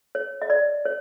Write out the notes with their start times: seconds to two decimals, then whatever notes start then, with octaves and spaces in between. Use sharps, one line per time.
0.15 C#5
0.42 D#5
0.50 D5
0.85 C#5